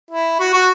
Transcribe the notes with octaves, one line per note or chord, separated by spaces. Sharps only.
E4
F#4
F#4